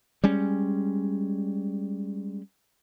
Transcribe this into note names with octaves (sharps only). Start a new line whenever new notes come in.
G3 G#3 C#4